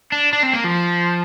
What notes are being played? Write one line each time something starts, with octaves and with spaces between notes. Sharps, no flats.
D4
D4
C4
A#3
F3